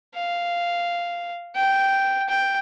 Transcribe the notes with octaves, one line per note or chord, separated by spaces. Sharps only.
F5
G5
G5